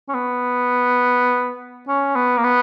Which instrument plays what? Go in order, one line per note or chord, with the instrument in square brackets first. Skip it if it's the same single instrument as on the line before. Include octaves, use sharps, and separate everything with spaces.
[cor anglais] C#4
B3
C#4
B3
A#3
B3